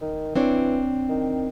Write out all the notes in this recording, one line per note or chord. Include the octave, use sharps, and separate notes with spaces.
D#3
E3 C4 D4 C#5
D#3